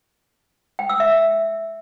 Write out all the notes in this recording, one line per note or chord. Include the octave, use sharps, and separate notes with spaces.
G5
E6
E5